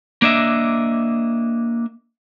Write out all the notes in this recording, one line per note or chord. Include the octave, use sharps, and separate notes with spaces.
A#3 D4 D#5 E5